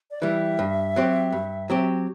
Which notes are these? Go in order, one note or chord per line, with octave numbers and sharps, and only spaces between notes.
D5
E3 G3 E5
G2
F#3 C4 G4
G2
F#3 C4 G4